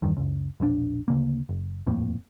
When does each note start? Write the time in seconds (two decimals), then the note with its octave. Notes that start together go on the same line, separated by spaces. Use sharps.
0.02 E2 G2 D#3
0.17 F#1 C#2
0.60 E1 A#1 A#2 D4
1.08 D2 C#3 A#3
1.49 F#1
1.87 D#1 F2 A2 A#3